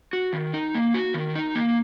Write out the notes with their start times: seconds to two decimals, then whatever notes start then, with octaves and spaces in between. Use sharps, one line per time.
0.13 F#4
0.33 D#3
0.54 D#4
0.75 A#3
0.94 F#4
1.14 D#3
1.35 D#4
1.55 A#3